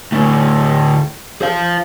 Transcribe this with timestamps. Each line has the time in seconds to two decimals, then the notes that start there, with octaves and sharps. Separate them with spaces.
0.12 D2 A2
1.42 C5 F5